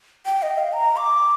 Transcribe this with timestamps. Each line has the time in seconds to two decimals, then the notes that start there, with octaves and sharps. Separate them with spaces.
0.26 G5
0.42 D#5
0.58 F5
0.73 A#5
0.97 D6